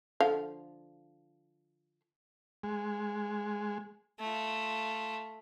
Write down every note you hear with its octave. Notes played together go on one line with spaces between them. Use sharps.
D3 F3 F5
G#3
A3 F4